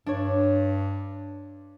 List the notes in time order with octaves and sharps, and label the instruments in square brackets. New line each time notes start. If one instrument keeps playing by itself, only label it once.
[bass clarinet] G2 [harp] D4 C#5